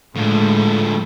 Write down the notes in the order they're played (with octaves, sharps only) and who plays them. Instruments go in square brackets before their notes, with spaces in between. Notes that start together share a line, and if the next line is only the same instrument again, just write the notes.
[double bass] A2 G#3 [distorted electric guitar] D3 F3